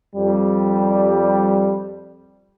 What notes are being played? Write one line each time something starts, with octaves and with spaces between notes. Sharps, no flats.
F2 G3